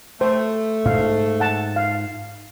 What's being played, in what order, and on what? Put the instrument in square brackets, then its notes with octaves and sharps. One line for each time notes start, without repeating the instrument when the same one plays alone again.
[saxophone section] A3 [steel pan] C5
[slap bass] G#2 [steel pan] F5
[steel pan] F#5 A5
F5